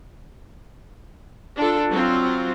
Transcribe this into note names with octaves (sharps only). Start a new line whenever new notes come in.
D4 F4 A4
F#3 C4 F4